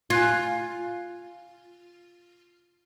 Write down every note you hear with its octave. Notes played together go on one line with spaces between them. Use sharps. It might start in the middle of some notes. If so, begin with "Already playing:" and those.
F4 G#5 F#6 G#6